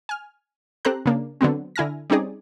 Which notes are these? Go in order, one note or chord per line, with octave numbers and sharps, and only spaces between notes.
G#5 F6
C4 G4 A4 C5 A#5 F#6
C#3 A#3 D4
D3 F#3 B3 C4
D3 E4 G#5 F6 A#6
G3 C4 C#4 D#4 G#4 D5